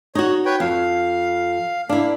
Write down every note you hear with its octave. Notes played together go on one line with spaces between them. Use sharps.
D#4 F#4 C#5
B4 C#5 G5
F2 F5
A#3 D4 E4 F5